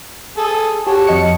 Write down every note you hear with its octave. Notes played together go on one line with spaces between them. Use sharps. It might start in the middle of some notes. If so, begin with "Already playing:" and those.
G#4 A4
F#4 G4 C#5 A5
F2 D#5 C#7